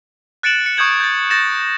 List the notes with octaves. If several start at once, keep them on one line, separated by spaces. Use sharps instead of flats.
F#6 A6 C#7 D7 E7 F#7
C#7
C#6 D#6 G6 G#6 F#7
G6 A6
G6 A6 A#6 C#7 E7